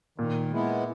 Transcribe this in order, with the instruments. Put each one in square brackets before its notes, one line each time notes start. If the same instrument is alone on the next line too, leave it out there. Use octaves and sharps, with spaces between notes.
[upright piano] A#2 [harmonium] D#3
[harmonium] G#3 B3 E4